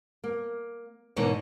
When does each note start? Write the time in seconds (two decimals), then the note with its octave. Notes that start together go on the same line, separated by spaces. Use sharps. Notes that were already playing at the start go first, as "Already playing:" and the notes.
0.24 A#3
1.16 G#2 B2 E3 A#3 D4 C#5